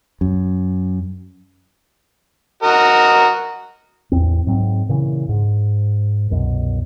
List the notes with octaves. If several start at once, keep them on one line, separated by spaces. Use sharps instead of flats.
F#2
F#4 A#4 D#5
A1 E2 C4
G#2 F#3 C4
A#2 C#3 E3
G#2
C2 F#2 B2